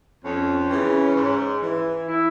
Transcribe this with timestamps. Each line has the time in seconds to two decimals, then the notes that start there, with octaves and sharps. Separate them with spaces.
0.24 F2 C#4
0.70 C#3 E3
1.16 G#2
1.62 E3
2.08 E4